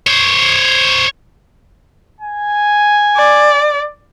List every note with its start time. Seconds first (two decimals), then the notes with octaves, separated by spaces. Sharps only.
0.07 C5 C#5
2.21 G#5
3.17 D5